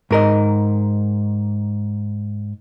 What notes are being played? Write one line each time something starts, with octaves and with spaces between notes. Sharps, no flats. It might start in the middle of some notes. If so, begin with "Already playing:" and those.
G#2 A#4 D#5